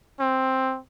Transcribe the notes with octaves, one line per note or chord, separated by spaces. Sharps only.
C4